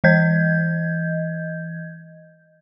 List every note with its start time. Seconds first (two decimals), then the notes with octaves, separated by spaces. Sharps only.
0.04 E3 D#5 G6 G#6